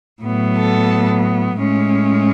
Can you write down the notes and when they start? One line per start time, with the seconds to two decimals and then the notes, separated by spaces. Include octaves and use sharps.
0.23 A2 F#3 B3
0.56 A4
1.58 A2 G#3 C#4